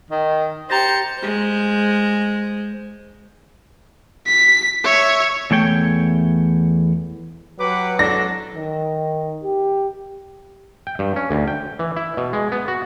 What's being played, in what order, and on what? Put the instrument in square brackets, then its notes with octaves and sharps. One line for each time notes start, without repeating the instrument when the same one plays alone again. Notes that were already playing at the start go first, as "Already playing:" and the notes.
[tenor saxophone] D#3
[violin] G4 C#7 [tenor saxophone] C5 [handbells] A#5 A6 A#6
[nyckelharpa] G#3 C5
[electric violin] B6
C#5 E5
[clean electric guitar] E2 A3 C#5 G5
[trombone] F#3 [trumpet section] G4 F#5 D6 [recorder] B4
[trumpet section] D4 [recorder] A4 [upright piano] A#6
[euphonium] D#3
G4
[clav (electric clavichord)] G5
G2
C#4
D2
G5
E3
E4
B2
G#3
B3
F#4